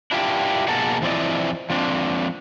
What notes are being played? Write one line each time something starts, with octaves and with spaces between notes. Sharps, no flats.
D4 E4 F4 G4
B2 A#3 G#4 A#4 F#5 A5
E3 F3 C4 E4 D5 D#5
F3 C4 D4